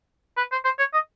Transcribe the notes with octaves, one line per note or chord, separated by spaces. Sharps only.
B4
C5
C5
C#5
D#5